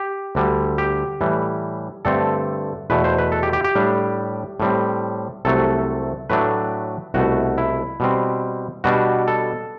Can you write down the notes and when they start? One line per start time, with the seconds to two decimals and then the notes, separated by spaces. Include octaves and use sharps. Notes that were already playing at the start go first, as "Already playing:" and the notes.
Already playing: G4
0.35 D2 D3 G3
0.78 G4
1.21 A2 E3 G3
2.05 G2 D3 A3 C4 A4
2.90 E2 B2 A3 B4
3.04 C5
3.19 B4
3.32 A4
3.43 G4
3.53 G4
3.64 G4
3.75 A2 G3 D4
4.60 A2 G3 C4
5.45 C2 C3 F#3 A3 A4
6.30 A2 F#3 A3 D4 B4
7.14 C2 B2 A3 F#4
7.58 E4
8.00 B2 G3 C4
8.84 B2 G3 D4 F#4
9.28 A4